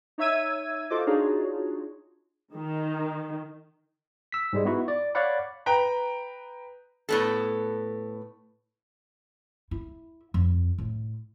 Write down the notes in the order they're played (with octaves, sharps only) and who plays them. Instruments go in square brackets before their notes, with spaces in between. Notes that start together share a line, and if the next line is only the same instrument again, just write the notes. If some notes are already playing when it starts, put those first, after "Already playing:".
[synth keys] D#4 C#5 E5 E6 G#6 D#7
F4 F#4 A4 C5 D#5 D6
D4 D#4 F4 F#4 G#4 C#5
[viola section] D#3
[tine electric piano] E6 B6
G#2 G3 G#3
B3 D#4 E4 F#4
D5
C#5 D5 F5 F#5 B5
[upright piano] B4 G5 A#5
[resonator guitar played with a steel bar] A2 B3 A4
[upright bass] E4
F2
A2